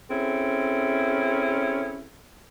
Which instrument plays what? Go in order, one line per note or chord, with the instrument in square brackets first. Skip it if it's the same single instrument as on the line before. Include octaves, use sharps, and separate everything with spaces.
[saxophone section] C4 C#4 E4 G#4 A4